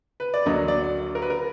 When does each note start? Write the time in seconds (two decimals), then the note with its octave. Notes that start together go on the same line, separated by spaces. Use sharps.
0.20 B4
0.34 D5
0.46 D2 D3 F#3 A#3 D#5
0.68 D5
1.15 A#4
1.22 B4
1.30 A#4